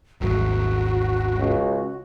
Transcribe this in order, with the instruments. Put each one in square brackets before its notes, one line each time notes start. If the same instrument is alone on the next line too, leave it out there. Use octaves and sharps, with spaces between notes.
[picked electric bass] D#1 G#1 [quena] F#4
[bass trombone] C#2